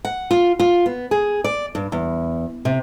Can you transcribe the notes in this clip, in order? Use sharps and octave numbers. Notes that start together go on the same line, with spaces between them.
F#5
F4
F4
B3
G#4
D5
G2
E2
C3